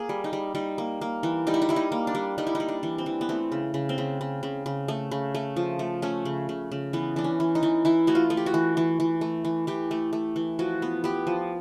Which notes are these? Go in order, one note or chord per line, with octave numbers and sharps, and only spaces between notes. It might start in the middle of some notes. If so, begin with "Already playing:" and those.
Already playing: A#3 G#4
G3
D#4
G3
G3 D#4
A#3
A#3
E3
G3 D#4
E4
D#4
G3 E4
D#4
A#3
D4
G3
G3 D#4
E4
D#4
G3
D4
E3
C4
E3
B3
A3 C4
C#3
C#3
C4
C#3
C#3
C#3
C#3
A3
C#3
A3
F3
A3
A3 C#4
C#3
C#3
C#3
E3 B3
E3 D4
C#4
E3
D#4
E3
E3 E4
A3 F#4
F4
A3
G4
F#4
E3
E3
E3
A3
E3
E3 G4
A3
A3
E3
F3 F#4
B3
B3 G4
F3